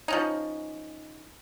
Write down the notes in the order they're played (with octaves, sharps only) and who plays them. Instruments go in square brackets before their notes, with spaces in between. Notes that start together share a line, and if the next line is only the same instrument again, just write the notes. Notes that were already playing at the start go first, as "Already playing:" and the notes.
[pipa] F3 C#4 D#4